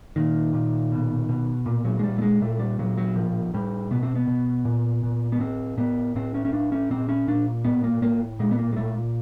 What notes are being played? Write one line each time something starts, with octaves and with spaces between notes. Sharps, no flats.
A#2 D#3
A#2
B2
B2
A#2
F#3
G#3
A#2 G3
A3
G#3
A#2 A3
G3
A#2 F#3
F#3
A2 F3
A2 G3
B2 B3
C4
B3
B2
A#2
A#2
B3
A2 C4
A2 B3
A2 C4
C#4
C#4
A2 D4
C#4
A#2 C4
C#4
A#2 D4
A2 B3
A#3
A2 A#3
A#2 G#3
B3
A#3
G#3
A#2 A3